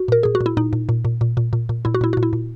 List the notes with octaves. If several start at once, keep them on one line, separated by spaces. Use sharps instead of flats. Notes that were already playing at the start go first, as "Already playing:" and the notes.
Already playing: F#4
A#2 A#4
A#2 G#4
F#4
A#2
E4
A#2 D#4
A#2
A#2
A#2
A#2
A#2
A#2
A#2
A#2 E4
F#4
A#2 E4
A#2 F#4
E4
A#2